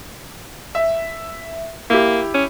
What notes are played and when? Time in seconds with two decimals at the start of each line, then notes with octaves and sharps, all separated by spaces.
0.75 E5
1.90 A#3 E4 G4
2.34 C#4